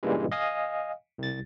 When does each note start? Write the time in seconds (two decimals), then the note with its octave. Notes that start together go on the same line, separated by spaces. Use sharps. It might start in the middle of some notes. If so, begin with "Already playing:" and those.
0.03 G2 A#2 C#3 E3 G3 G#3
0.32 D#5 F5 G#5 D#6
1.18 C2 A6